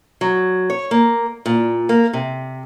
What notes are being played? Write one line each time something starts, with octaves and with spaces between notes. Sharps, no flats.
F#3
C#5
A#3
A#2
A#3
C3